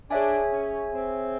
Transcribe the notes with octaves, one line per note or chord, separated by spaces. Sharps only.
D4 G#4 C#5 E5 G#5
C#4
C4